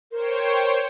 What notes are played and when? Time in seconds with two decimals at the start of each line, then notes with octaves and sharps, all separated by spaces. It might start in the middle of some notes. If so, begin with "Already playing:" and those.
0.12 A#4 C5 C#5 G5